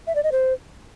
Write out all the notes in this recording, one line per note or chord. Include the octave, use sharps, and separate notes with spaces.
E5
D5
D#5
C5